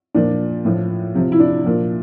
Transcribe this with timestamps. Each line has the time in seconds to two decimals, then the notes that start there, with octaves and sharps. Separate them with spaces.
0.14 A#2 F3 D4
0.65 A2 F3
1.14 C3 F3
1.32 E4
1.40 D4
1.64 A#2 F3